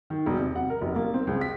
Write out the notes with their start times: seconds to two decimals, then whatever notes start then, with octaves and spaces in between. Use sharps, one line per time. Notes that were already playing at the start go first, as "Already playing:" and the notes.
0.10 D#3
0.26 E1
0.39 C3
0.56 F#5
0.70 A#4
0.81 F1
0.96 A#3
1.14 C4
1.27 C#2
1.41 B6